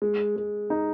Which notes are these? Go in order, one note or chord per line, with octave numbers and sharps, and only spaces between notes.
G#3
G#3
D#4